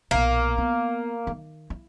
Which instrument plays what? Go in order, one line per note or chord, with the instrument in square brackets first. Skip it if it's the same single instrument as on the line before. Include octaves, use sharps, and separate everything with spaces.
[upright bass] B1 A#2 [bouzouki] A#3
[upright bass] B3
D#3
E4